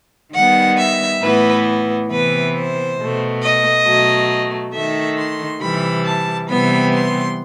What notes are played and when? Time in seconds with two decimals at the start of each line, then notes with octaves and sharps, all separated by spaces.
0.33 D#3 G3 B3 F#5
0.77 E5
1.21 A2 E3 B3 B4
2.09 C3 E3 B3 B4
2.54 C5
2.97 B2 A3
3.41 D#5
3.85 B2 F#3 A3
4.73 D#3 A3 E5
5.17 C6
5.60 C3 E3 G3 B5
6.05 A5
6.48 C3 E3 G3 B3 B5
6.92 C6